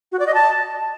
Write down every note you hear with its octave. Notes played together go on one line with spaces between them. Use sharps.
F#4
D5
D#5
A5